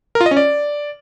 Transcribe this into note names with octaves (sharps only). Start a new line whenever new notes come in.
A#4
F4
D#5
C#4
D5